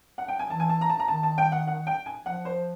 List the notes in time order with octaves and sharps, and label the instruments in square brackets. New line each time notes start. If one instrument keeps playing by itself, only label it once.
[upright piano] F#5
G5
G#5
[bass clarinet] E3 [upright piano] A5
[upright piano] G#5
A5
A#5
A5
A#5
[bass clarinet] D#3 [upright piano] A5
[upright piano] A5
G5
F#5
F#5
G5
G#5
[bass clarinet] F3 [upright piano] F#5
[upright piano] C5